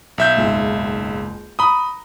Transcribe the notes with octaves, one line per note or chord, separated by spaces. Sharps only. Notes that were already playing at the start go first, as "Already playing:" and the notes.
B1 E5 G6
F#1 C#2 G#2
A#5 B5 D#6 G7